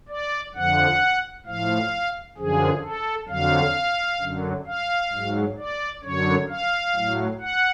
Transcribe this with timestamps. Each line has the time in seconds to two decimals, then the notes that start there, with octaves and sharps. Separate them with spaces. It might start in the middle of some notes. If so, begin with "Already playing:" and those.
0.09 D5
0.54 F2 D3 F3 F#5
1.46 A2 F3 F5
2.37 F#2 D3 F3 G#4
2.83 A4
3.29 F2 D3 F#3 F5
4.20 F#2 D3 F#3
4.66 F5
5.12 G#2 F#3
5.58 D5
6.03 F#2 D3 F#3 C#5
6.49 F5
6.95 A2 F#3
7.40 F#5